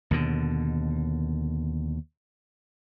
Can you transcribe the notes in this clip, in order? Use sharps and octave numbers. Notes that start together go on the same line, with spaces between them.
D#2 B2 D3